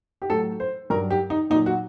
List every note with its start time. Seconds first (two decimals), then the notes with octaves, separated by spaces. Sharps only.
0.22 G4
0.30 A2 F#3 A4
0.60 C5
0.90 G2 F#3 A#4
1.10 G4
1.30 D#4
1.50 A#2 D#4
1.55 F#3
1.66 F#4